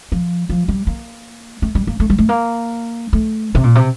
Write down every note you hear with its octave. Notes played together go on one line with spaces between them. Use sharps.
F3
F3
G3
A#3
A3
G3
A#3
A3
G3
A3
A#3
A3
C3
A#2
C3